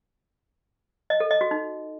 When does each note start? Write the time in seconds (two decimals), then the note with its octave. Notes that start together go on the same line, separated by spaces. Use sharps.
1.10 D#5
1.20 A4
1.31 D#5
1.41 F#4
1.51 D#4